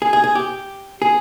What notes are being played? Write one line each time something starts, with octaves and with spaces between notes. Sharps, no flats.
G#4
G#4
G#4
G4
G#4